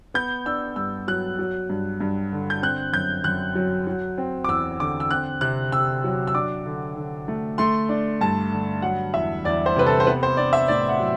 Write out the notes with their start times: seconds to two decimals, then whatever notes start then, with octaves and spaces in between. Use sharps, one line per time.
0.14 B3 G6
0.46 D4 E6
0.76 G2 E6
1.08 F#3 F#6
1.39 F#3
1.69 G2
2.00 G2
2.32 D3
2.50 G6
2.62 C4 F#6
2.93 F#2 G6
3.24 F#2 F#6
3.55 F#3
3.87 F#3
4.18 C4
4.44 D6
4.48 E2 E6
4.80 D3 D6
5.00 E6
5.11 C4 F#6
5.41 C3 F#6
5.72 C3 E6
6.04 F#3
6.27 E6
6.34 D4 D6
6.66 D3
6.96 D3
7.28 A3
7.58 A3 C6
7.89 D4
8.21 G2 A5
8.52 D3
8.82 F#3 F#5
9.14 E2 E5
9.45 E2 D5
9.66 C5
9.76 C3 B4
9.86 A4
10.00 C5
10.07 B3 B4
10.23 C5
10.37 D4 D5
10.53 E5
10.68 A2 D5
10.89 F#5
11.00 F#3